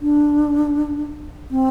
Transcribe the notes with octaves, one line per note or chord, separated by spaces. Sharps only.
D4
C4